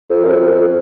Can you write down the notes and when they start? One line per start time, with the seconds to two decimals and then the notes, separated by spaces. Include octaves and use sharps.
0.10 F2
0.24 F#2
0.30 F2
0.50 F2